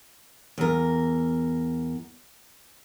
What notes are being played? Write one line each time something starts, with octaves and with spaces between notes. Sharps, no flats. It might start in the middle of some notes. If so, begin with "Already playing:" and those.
E2 A#4